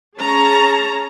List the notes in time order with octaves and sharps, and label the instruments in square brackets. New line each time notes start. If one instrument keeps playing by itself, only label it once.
[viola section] C#4 G#4 C#5 A5 A#5